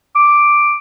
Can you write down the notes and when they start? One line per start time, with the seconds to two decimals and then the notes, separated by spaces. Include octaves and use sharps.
0.16 D6